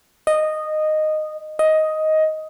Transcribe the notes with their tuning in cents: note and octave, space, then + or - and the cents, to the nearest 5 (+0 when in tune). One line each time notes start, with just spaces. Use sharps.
D#5 -10
D#5 +10